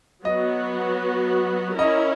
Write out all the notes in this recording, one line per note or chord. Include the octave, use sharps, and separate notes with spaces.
F#3 B3 F#4 D#5
C#4 E4 A#4 D#5